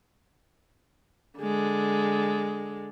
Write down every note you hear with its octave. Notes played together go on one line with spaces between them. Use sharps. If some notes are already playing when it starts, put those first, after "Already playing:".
D3 G#3